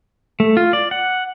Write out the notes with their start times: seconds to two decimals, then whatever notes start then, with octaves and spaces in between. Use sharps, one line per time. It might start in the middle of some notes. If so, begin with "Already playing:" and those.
0.40 A3
0.57 F4
0.73 D5
0.91 F#5